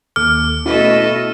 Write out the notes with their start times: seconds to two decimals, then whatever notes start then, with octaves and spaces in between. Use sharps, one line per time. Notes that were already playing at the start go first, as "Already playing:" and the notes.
0.16 D#2 A4 D6 F6
0.66 B2 A3 C#4 E4 F#4 A4 B4 D#5